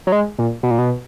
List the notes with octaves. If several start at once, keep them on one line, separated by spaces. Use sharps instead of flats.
F#3
G#3
A#2
B2
A#2
B2